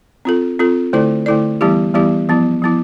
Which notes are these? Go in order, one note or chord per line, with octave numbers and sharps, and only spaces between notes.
C4 F4 A4
C4 F4 A4
D3 A3 E4 A4 D5
D3 A3 E4 A4 D5
E3 G3 B3 E4 G4
E3 G3 B3 E4 G4
F3 B3 E4
F3 B3 E4